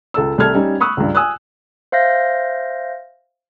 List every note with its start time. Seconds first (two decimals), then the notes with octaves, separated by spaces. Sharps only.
0.14 C#2 A4 E6
0.38 C2 G3 A3 A5 F6 G#6
0.55 G3 C#4 D#4
0.80 B5 C#6 D#6 E6 F#6
0.97 C#2 G2
1.15 G#5 D#6 E6 F#6
1.92 C5 E5 F5 G6 A#6